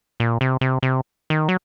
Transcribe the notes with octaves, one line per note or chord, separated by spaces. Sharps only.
A#2
C3
C3
C3
D#3
F#3